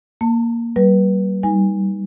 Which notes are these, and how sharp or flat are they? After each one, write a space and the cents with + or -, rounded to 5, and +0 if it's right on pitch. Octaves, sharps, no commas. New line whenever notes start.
A#3 +0 A5 +25
G3 -40 B4 -25
G3 +0 D#4 +20 G#5 -20